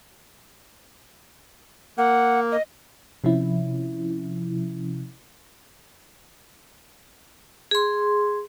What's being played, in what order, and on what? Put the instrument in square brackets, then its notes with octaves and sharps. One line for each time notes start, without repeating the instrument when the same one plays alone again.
[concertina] A#3 [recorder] F#5
[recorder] D#5
[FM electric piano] C3 F3 C#4 E4
[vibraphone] G#4 C6